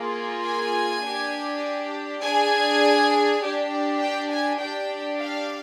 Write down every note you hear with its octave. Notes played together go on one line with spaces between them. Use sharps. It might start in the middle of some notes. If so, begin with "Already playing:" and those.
Already playing: A#3 F4 G#4
G#5
D4 G4
D4 G#4 G#5
D4 G4
G5
G#5
D4 G4 G5
F5